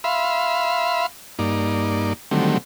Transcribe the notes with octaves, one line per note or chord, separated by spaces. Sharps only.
E5 F5 B5 C6
G2 A#3 D#4 D5
D3 D#3 F#3 G3 A3 C4